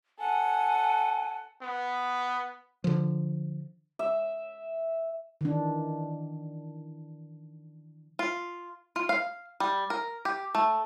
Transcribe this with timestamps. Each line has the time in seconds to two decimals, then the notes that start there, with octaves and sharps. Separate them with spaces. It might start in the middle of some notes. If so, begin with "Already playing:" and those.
0.19 A4 F#5 G#5
1.62 B3
2.84 D3 F3
3.99 E5
5.41 D#3 E3 D4
8.19 F4
8.96 F4
9.09 F5
9.60 G3
9.90 A#4
10.25 G4
10.55 A3